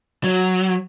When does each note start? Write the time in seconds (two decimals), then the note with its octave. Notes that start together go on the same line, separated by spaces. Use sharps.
0.24 F#3